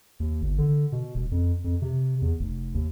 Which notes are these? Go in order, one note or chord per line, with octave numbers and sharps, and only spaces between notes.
D#2
G1
D3
B2
E1
F2
F2
C3
E2
F1
D#2